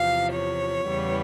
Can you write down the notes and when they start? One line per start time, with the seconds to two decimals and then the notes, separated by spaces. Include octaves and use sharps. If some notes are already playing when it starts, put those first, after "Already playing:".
Already playing: E2 C3 F3 F5
0.31 C#5
0.85 E2 C#3 E3 G3 B3